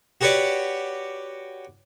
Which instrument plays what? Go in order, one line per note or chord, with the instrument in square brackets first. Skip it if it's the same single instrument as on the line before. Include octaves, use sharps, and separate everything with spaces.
[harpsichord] F#4 G4 B4 C#5 D5